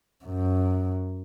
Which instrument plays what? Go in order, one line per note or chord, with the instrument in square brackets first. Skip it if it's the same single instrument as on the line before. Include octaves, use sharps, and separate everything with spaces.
[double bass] F#2